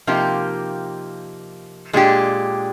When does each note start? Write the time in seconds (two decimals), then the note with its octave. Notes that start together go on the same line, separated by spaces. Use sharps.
0.07 C3 F3 A#3 D#4 G4
1.93 A#2 G#3 D4 G4